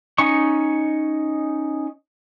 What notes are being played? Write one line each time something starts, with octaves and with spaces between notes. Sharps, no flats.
C#4 D#4 C#6